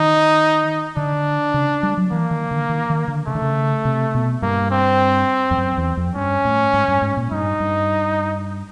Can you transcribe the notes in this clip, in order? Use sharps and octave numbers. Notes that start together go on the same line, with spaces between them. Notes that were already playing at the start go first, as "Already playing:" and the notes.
Already playing: D#3 D#4
D3 D4
C#3
G3
F#3
E3 A#3
D#3
D3
D#3
D#3
D3
C#3 A3
D3
C#3
C3
B2
G2 A#3
C4
F2
F#2
E2
F2
G2 C#4
A2
G#2
G2
G#2
A#2
G2 D#4
G2